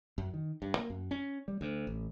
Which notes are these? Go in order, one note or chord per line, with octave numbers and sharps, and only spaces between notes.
F#2
D#3
G2
A#3
F#2
C#4
G3
D2
A1